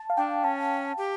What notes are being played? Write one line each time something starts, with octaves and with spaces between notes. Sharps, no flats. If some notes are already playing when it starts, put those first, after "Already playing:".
Already playing: A5
F5
D4 G5
C#4 A5
G4